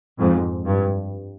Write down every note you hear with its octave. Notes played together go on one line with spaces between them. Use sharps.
F2 G#2
G2